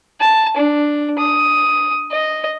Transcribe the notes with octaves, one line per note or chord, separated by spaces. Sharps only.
A5
D4
D#6
D#5